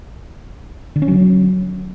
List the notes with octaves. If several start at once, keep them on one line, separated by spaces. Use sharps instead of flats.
D3
C#4
F#3